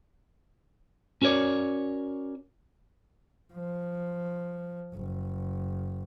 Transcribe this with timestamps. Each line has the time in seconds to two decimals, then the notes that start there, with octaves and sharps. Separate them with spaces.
1.22 C#4 F#4 A#4 C#5 D5
3.54 F3
4.94 F#1